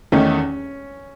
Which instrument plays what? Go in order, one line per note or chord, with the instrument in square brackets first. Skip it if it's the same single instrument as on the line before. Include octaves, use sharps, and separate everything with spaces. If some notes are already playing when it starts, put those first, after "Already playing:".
[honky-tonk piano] E2 D#3 A3 D#4 [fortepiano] C#4